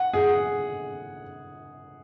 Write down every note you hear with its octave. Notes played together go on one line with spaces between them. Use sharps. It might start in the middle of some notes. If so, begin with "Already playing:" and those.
Already playing: F#5
G#4